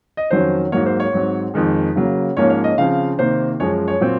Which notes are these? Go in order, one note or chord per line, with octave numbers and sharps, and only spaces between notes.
D#5
F2 D#3 F#3 C#4 C5
G#2 F#3 A#3 C#5
C5
C#5
G#2 F#3 C4
F2 D#3 G#3
C#3 F#3 A#3
G#2 F3 A#3 C#4 C#5
C#5
D#5
C#3 F3 C4 F5
C3 D#3 A#3 C5
F#2 F3 G#3 C#4 C#5
C#5
A#2 F#3 C4